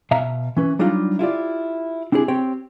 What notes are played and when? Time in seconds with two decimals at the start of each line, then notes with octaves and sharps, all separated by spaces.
0.11 B2 E5 F5 A#5
0.57 E3 C#4 B4
0.79 F#3 G3 D4 D#4 F4
1.19 E4 F4 G4 D5
2.12 C4 D4 E4 G4 G#4
2.28 C4 G4 C#5 G5